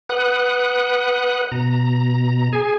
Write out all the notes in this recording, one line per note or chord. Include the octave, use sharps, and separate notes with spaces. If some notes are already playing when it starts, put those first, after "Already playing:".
B4 F#5 D#6 F#6
B2 A#5
G#4 G#5